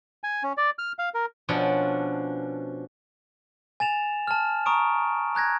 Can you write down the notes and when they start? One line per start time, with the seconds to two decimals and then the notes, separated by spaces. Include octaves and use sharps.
0.24 G#5
0.43 C#4
0.57 D5
0.79 F6
0.99 F5
1.14 A#4
1.49 B2 F3 B3 C#4 D4
3.80 G#5 A6 E7 F7
4.27 A5 F6
4.66 A#5 C#6 D#6 D7
5.35 A#5 F#6 G#6 A#6